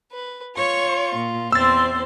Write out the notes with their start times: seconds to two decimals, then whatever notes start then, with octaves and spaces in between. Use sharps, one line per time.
0.12 B4
0.57 F4 C#5 C#6
1.16 A#2
1.52 E2 C4 C5 C6 E6 A6